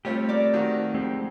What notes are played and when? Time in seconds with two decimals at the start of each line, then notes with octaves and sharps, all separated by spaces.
0.05 G3 A3 C4 F4 G4 C#5
0.29 A#3 D5
0.54 D#3 F#3 F5 F#5 A5
0.94 F2 G#3 C4 G4